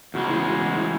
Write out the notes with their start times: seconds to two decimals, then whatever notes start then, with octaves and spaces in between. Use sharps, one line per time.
0.14 E2 C#3 G#3 F#4
0.29 E4
0.46 F#4
0.60 F#4
0.76 E4